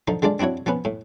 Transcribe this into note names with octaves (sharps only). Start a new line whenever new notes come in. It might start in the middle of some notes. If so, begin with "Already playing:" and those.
D3 F3 D#4
D3 G#3 D4 F4 D5
C4 D4 E4 F#4 C#5
F3 B3 C#4 B4
A2